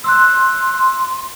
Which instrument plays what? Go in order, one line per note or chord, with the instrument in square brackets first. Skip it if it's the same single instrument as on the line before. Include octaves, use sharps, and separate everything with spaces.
[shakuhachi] C6 [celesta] E6 F#6